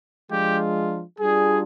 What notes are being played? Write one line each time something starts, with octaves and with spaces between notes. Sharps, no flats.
F3 G#3 D4 F4 G4
G3 D4 F4 G#4